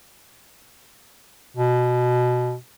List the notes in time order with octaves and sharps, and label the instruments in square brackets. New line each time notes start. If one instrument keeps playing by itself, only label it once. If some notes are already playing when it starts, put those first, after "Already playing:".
[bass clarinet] B2